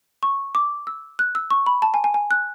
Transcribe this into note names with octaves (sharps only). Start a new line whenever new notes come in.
C#6
D6
E6
F#6
E6
C#6
B5
A5
G#5
G#5
G#5
F#6